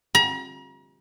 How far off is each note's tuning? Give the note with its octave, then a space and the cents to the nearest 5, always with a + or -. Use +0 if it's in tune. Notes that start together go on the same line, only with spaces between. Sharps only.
A#5 +40